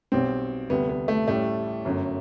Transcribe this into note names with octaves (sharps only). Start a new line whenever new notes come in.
B1 B2 G3 C4
D2 C3 G3 B3
B3
A3
A1 A2 G3 A3
G1 F#2 F#3